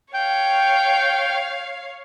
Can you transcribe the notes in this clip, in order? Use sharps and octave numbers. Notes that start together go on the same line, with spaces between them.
C#5 F5 G5